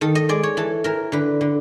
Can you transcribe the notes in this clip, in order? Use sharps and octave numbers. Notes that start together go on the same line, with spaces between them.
D#3 A4
D#5
G#3 D5
C#5
E3 A4
E3 A#4
D3 B4
D3